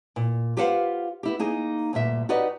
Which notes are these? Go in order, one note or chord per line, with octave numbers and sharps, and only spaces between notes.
A#2
F4 G4 B4 C5 F5 F#5
B3 E4 G4
A#3 D#4 G#4
D2 G2 A#2 E5
D#4 F#4 G4 B4 D5 D#5